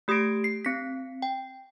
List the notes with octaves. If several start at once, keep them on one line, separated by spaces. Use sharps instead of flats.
A3 G4 D#6 G#6 A#6 D7
C7
C4 B6
G5